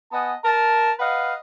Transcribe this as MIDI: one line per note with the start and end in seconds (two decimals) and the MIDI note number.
0.12 0.34 59
0.12 0.34 75
0.12 0.34 78
0.12 0.34 80
0.12 0.34 81
0.45 0.91 70
0.45 0.91 81
0.99 1.34 71
0.99 1.34 75
0.99 1.34 77
0.99 1.34 78